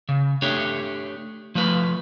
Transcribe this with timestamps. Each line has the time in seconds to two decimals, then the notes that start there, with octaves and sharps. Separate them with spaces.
0.09 C#3
0.42 A3 D4 G4 C#5
1.55 F3 A3 F4 B4